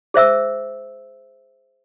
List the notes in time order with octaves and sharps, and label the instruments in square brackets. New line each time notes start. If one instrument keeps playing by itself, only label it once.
[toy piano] G#4 C5 E5 E6